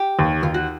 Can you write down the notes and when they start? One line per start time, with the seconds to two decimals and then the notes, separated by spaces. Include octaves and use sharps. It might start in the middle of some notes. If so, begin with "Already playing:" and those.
Already playing: G4
0.19 D#2
0.43 D#2 F4
0.54 F#4